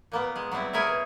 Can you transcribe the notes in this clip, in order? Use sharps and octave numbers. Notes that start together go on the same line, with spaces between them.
A#2 A#3 B3
G#3
F#3 G3 B3 C4 E4
E4 G#4 A#4 C#5 E5
B2